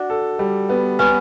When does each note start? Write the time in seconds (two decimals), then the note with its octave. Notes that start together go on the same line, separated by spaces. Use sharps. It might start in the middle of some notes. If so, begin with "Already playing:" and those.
Already playing: D4 F#4
0.10 A4
0.39 G3
0.69 B3
0.99 B3 C#4